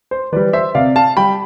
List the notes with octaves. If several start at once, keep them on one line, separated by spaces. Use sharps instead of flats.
C5
E3 G3 B4 D5
C5 E5
C3 D5 F5
F5 A5
G3 G5 B5